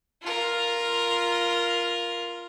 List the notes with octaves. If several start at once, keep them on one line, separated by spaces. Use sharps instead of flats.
F4 A#4